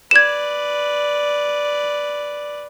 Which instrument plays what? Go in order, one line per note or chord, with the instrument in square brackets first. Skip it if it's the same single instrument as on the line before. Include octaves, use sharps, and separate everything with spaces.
[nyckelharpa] B4 D5 [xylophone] G#6 E7